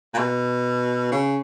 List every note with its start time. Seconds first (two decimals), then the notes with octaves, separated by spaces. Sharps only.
0.14 A#2
0.18 B2
1.12 C#3